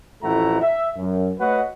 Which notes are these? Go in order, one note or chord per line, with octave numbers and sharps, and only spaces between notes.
A1 F2 A3 E4 F#5 A#5
E5
F#2
A3 F#4 B4 C#5 D#5 F#5